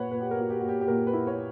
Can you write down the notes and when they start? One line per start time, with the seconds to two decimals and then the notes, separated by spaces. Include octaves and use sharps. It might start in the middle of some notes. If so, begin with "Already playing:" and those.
Already playing: A#2 A#3 B4 C#5 F#5
0.11 A#2 B4
0.21 G4
0.31 A#4
0.37 A#3 F#4
0.50 G4
0.60 A#3 F#4
0.69 G4
0.81 G4
0.88 A#2 A#4
1.07 B4
1.13 E4
1.27 C#5